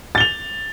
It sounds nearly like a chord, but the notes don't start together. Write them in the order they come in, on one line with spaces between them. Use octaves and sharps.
A6 G7 F7